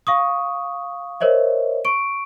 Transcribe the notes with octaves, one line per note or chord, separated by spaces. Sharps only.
F5 C#6 D#6
A#4 C5 C#5 D#5 E5
C#6 D7